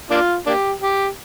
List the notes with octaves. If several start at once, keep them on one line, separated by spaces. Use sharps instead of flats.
A#3 D4 F4
A#3 D4 G4
G4